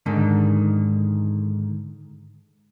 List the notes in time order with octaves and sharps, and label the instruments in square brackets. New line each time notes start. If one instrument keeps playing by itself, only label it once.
[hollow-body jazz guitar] G#2 D3 D#3